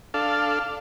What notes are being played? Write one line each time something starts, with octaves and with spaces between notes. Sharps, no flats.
D4 A4 F5